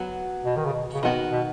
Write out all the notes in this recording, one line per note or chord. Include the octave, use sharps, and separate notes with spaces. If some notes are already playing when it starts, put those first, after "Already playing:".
Already playing: F#3 B3 F#4
B2
D#3
C#3
B2
C#3
B2 D#3 B3 F#4
B2